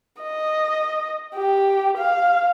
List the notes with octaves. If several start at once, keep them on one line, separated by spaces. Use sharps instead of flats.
D#5
G4
F5